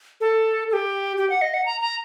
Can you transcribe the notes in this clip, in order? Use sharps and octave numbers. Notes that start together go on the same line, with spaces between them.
A4
A4
G4
G4
F#5
D#5
F#5
A#5
A#5